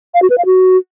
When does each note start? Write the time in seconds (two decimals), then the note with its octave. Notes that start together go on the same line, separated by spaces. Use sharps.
0.14 F5
0.22 F#4
0.30 B4
0.38 F5
0.46 F#4